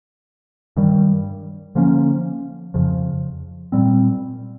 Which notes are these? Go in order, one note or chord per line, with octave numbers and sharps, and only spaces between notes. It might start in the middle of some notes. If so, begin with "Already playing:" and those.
G2 D#3 G3
D3 F3 A#3 C#4
F2 C#3 F3
A#2 G3 C4